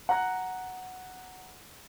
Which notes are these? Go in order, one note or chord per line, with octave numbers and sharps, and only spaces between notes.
F#5 A#5 F#6